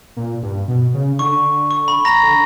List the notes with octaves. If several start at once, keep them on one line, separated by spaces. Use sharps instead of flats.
A#2
G2
B2
C#3
D3 C#6
C#6
B5
A#5 A#6
D3